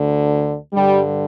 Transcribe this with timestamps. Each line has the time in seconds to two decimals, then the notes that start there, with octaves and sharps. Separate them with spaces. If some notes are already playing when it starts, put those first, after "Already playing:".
Already playing: D2 D3
0.73 G2 D3 G3